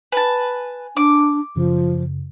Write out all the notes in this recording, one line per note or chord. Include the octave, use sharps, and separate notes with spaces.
B4 G#5 A5
D4 D6
F#2 C#3 F3